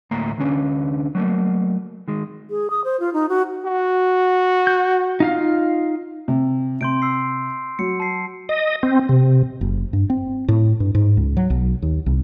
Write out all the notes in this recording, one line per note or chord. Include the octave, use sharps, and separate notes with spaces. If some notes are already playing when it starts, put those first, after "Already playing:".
D2 A2 A#3 A#5
D2 D3 C#4 D4
F#3 A3 A#3
D#3 G#3
G#4
D#6
C5
F4
D#4
F#4
F#4
G6
D#4 F4 F5
C3
C3 C6 G6 D7
E6 C7
F#3 C#7
A5 C7
D#5
C4
C3
F#1
G2
C4
A2
G2
G#2
C#2
F#3
B1
D#2
C2